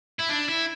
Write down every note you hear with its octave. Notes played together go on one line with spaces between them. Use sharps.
E4
D4
E4